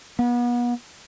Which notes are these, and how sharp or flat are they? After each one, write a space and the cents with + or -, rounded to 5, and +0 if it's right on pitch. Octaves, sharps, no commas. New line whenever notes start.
B3 -35